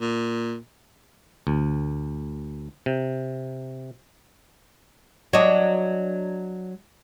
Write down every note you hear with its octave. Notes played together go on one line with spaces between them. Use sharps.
A#2
D2
C3
F#3 D4 C#5 D#5